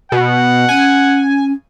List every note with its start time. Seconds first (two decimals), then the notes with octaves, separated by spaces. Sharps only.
0.12 B2 F#5
0.69 C#4 G#5